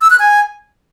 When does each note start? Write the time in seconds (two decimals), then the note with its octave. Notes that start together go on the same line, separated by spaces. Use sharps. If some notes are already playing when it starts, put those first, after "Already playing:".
0.01 E6
0.10 F#6
0.19 G#5